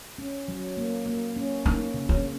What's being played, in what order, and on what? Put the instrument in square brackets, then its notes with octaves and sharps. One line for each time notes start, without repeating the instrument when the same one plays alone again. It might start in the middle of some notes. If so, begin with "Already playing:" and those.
[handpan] C#4
F#3
A#3
A#3
C#4
[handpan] A#3 [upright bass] D#4
[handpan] C#3
[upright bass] C#4